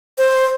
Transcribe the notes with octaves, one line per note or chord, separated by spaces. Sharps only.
C5